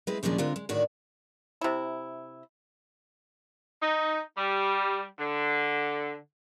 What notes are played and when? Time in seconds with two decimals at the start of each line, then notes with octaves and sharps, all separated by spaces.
0.07 G#3 C4 E4 B4
0.23 D#2 A#2 C#3 F3 G#3 D4
0.38 D3 G#3 C4 F4 A#4 F#5
0.56 G#3
0.69 D2 A2 D#3 F#4 C#5 D5
1.61 C3 E4
3.82 D#4
4.37 G3
5.19 D3